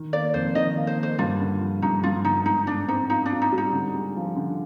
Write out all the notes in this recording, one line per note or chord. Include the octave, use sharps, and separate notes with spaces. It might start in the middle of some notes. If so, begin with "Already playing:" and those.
Already playing: D#3
A#3 D5
F2 C5
D#3 D#5
A#3
C5
A#3
C5
G2 F4
D3
F3
G2 D#4
G2 F4
D3 D#4
G#2 D#4
G#2 D4
C4 D#4
D#4 F4
D4
F4
D#4
G3
D#4
D3
G#3
F3
D3